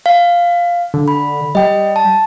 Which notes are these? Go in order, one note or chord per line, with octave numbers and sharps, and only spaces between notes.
F5
D3
B5
G3 D#5 G5
A5